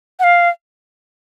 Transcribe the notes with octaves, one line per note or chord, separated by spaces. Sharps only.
F#5
F5